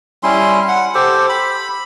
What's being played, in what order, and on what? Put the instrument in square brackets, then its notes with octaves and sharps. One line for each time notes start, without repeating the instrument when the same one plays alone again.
[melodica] G3 C#4 E4 C6
F#5
G4 A4 C5
B5